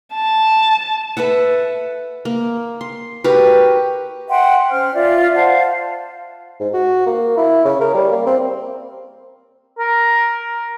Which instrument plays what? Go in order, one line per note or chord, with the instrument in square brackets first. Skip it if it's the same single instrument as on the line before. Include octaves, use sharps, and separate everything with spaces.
[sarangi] A5
[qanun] A4 B4 E5 F#5
A#3
C6
F#4 G4 A#4 B4
[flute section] E5 F#5 G5 C6
C#4 C5 F6
F4 D5 E5
C5 F5 F#5 A5
[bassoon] G#2
F#4
A#3
E4
C#3
A#4
G3
A#3
C4
[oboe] A#4